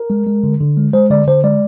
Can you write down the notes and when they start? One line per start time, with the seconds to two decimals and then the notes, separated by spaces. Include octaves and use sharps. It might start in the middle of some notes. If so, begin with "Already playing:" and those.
Already playing: A#4
0.10 G#3
0.27 G#3
0.43 D3
0.60 D3
0.77 G#3
0.93 G#3 C5
1.10 D3 D5
1.27 D3 C5
1.44 G#3 D5